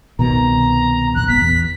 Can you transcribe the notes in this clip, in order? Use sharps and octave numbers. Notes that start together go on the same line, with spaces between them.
C2 B2 D#3 A#5
F1 A#1 F#6
G#1 B3 B6
E2